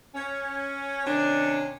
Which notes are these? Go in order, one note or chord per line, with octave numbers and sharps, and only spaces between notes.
C#4
C3 D#3 C#4 D4